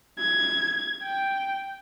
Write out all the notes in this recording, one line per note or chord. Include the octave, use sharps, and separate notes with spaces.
G#6
G5